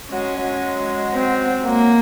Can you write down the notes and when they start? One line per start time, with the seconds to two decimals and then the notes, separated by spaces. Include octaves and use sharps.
0.12 F#3 G#3 C#4
0.37 F#3 G#3
1.14 C4
1.65 F#3 G#3 A#3